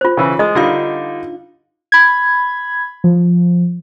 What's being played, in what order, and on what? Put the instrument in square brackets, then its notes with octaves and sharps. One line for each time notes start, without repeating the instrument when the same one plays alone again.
[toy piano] F4 C5
[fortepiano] C#3 E3
[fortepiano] G#3 [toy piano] D#5 D#6
[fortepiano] D3 G3 D#4 [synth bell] D4 F4 F5
[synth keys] B5 G#6
F3